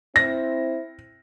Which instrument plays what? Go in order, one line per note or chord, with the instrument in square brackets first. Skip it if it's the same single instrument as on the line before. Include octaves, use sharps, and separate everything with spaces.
[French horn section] C4 E4 C5 [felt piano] A#6